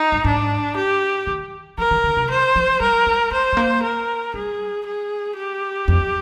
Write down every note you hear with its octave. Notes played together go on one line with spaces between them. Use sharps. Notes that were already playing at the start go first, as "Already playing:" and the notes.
Already playing: D#4
G#2
G#2 D4
G4
D#3
F3 A#4
D#3
D3
C3
D#3 C5
F3
G3 A#4
G3
G#3 C5
G#3
A#3
A#4
G3 G#4
G#4
G4
F2